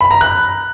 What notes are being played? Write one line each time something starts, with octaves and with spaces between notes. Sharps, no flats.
B5
A#5
F#6